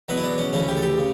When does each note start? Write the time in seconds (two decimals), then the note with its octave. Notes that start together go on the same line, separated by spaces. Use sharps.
0.09 E2 B2 F#3 B4
0.17 E4
0.24 D4
0.38 C#4
0.53 D2 C#3 E3 C#4
0.68 G4
0.77 A4
0.82 G4
0.97 C#3